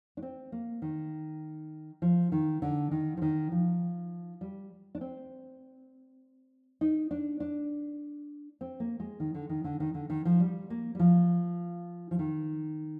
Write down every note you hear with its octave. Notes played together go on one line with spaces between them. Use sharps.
D4
C4
A#3
D#3
F3
D#3
D3
D#3
F3
D#3
F3
G3
D4
C4
D#4
D4
D4
C4
A#3
G#3
D#3
D3
D#3
D3
D#3
D3
D#3
F3
G3
A#3
G3
F3
F3
D#3